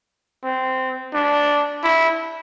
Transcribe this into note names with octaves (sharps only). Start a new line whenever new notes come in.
C4
D4
E4